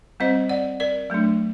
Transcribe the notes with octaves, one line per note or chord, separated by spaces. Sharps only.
G3 C4 C5 D#5
D5 F#5
A#4 D5
F#3 A3 D4